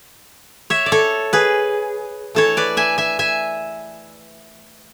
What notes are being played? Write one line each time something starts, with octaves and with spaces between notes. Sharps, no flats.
C#5 E5
D5
A4 C#5
G#4 B4
E3 A3 E4 A4 C#5
B4 D5
E5 G#5
E5 G#5
E5 G#5